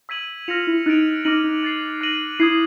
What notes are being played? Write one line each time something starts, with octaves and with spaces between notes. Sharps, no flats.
E6 G#6 B6 D#7 F#7
F4 F6 A#6 C#7 F7
E4
D#4 F#6 A6 D7 F7
D#4 D6 F6 A#6 D#7 F#7
D#4
F#6 A6 C7
F#6 A#6 D#7 F#7
E4 D#6 G#6 C7